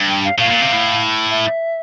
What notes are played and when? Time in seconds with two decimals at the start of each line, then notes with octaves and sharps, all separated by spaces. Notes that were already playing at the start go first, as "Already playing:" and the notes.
Already playing: G2
0.09 G5
0.24 F5
0.39 A2 F5
0.51 A#2
0.62 C3
0.73 A2
1.29 E5